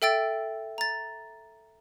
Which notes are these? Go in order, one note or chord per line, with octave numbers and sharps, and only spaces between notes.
A4 E5 G5 E6 A6 D7
A#5 A6